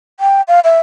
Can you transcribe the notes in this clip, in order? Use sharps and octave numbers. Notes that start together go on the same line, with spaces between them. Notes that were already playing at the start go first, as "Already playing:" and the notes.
G5
F5
E5